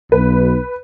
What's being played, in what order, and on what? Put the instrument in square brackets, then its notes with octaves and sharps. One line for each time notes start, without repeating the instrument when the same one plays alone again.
[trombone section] B1 [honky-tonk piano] B4